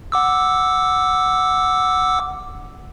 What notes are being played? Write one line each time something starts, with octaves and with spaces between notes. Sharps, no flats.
F#5 D6 E6